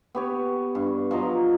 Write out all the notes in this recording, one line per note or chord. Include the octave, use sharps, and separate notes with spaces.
B3 G4 C#5
G2
F3 F#3 D#5 A#5